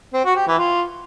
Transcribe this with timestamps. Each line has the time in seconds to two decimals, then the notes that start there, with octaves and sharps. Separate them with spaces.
0.13 C4
0.25 F#4
0.36 G4
0.47 E3
0.58 F4